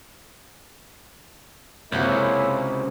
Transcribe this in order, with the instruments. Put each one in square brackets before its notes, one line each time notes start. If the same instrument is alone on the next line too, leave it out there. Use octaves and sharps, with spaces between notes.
[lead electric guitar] C#2 [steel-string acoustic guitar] C3 C5 F#5 [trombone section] A#3 C#4 E4